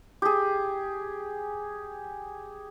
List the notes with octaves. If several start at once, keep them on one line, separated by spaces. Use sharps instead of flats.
G4 G#4